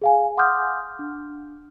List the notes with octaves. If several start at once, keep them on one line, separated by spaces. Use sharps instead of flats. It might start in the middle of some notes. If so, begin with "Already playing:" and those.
G#4 F5 G#5
F#5 C6 D6 D#6 F6 G6
D4